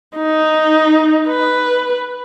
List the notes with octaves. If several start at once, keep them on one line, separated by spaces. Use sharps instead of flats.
D#4
B4